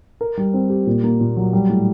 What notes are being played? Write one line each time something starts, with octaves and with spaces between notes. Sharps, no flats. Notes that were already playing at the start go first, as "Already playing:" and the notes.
A#4
G3
C4
G4
A#2
A#3
A#2
F#3
G3
A2